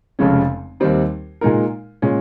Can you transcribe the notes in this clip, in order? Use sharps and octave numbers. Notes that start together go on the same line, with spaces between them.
F1 F2 C#3 G#3 C#4
D#2 D#3 G3 C4 D#4
A#2 G#3 D#4 A#4
A#2 G#3 C#4